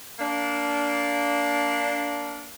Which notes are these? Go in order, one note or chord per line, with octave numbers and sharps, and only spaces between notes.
A#3 D4